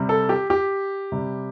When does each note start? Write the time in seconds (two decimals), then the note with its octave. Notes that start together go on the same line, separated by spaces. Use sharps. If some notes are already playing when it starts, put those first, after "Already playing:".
Already playing: C3 G3
0.09 A4
0.29 G4
0.50 G4
1.12 C3 G3